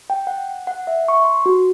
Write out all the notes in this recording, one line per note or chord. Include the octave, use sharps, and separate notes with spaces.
G5
F#5
F#5
E5
C#6
C6
F#4